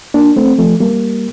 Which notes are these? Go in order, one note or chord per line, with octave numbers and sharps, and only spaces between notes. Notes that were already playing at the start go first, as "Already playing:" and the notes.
A#3 D4
A3 C4
F3 A3
G3 A#3